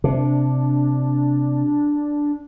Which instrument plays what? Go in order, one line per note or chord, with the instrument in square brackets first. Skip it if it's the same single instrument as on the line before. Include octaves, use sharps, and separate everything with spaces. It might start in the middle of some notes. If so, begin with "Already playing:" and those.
[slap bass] C3 [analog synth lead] D4